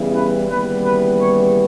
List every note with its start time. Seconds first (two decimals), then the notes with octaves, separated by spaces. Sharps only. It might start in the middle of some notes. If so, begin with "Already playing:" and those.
Already playing: E2 C#3 E3 G3
0.14 B4
0.49 D#2 C#3 E3 G3 B3 B4
0.84 B4
1.20 C#5